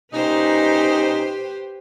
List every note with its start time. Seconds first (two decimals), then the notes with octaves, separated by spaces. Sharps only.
0.13 A#2 C#4 D#4 G4 B4 C5